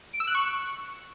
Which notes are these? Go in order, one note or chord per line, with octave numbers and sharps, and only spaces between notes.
D7
E6
F#6
C#6